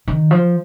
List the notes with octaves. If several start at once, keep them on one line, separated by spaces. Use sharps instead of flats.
D#3
F3